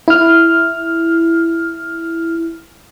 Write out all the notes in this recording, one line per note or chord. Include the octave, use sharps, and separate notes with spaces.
E4 F6